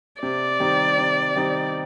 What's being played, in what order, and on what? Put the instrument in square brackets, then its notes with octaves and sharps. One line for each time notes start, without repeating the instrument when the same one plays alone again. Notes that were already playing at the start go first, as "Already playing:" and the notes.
[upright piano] C3 [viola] D5
[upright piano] D#3 G3 C4 D#4
C3
D#3 G3 C4 D#4